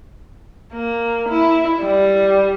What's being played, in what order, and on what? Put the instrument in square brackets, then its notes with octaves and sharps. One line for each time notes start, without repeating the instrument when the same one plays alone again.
[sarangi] A#3
E4
G3